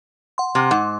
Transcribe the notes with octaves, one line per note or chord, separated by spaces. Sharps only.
F#5 C6
C3
G#2 F#5